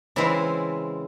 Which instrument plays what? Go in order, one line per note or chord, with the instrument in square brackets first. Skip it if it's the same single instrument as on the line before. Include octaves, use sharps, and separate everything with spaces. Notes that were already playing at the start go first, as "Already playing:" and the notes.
[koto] C#3 E3 G#3 C4 E4